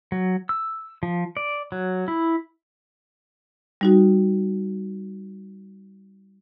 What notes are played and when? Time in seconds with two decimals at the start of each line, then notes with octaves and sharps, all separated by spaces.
0.12 F#3
0.49 E6
1.03 F3
1.37 D5
1.72 F#3
2.08 E4
3.81 G3 D#4 F#4